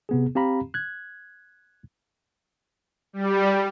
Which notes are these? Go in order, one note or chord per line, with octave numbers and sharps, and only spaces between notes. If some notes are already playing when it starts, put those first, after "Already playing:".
C3 B3 G#4
C4 G4 F5 A#5 B5
F#6 G#6
G3